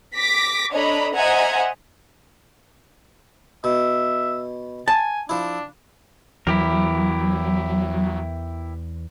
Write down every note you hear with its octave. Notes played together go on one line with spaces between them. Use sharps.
D6 A#6 B6
D4 A4 C#5 D#5 A#5 B5
C5 D#5 E5 F#5 G#5 A#5
B2 E5
G#5 A5
F3 D4 E4
E2 E3 F#3 E4 G4 A#4